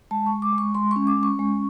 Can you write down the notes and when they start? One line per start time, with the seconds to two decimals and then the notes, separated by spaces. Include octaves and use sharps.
0.11 G#3 A5
0.26 C#6
0.32 G#3
0.42 D6
0.53 G#3
0.58 C#6
0.75 G#3 C6
0.91 C#4 C#6
1.07 D6
1.17 C#4
1.23 C#6
1.39 G#3